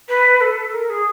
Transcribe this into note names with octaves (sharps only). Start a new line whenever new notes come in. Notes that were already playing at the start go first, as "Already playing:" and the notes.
B4
A4
A#4
G#4